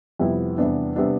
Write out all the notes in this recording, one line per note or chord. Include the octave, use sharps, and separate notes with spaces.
F2 C3 G3 B3 E4
E2 C3 G3 B3 D4
C3 G3 B3 D4